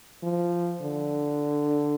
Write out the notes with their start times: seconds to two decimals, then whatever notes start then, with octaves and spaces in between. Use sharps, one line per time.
0.23 F3
0.82 D3